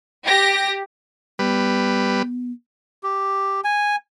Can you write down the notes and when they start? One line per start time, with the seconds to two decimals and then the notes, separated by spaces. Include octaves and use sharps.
0.25 G4 A#6
1.39 G3 B3 B4
3.03 G4
3.64 G#5